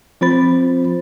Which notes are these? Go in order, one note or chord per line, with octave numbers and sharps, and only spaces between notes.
F3 C4 F4 C5 B5 A6